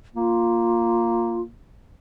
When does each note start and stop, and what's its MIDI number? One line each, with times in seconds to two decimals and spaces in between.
0.16 1.49 58
0.16 1.41 65